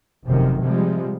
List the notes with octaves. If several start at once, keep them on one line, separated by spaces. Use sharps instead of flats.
F1 F#2 C3 D#3
C3 F3 G3 G#3